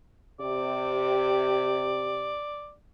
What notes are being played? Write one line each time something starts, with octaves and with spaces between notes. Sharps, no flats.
C3 G4 D5